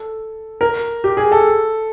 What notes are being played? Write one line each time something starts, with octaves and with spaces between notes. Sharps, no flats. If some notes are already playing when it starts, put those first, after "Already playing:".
Already playing: A4
A#4
G4
G#4
A4